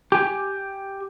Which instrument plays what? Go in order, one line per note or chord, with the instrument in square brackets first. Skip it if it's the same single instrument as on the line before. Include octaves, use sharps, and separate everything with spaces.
[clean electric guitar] G4 G#5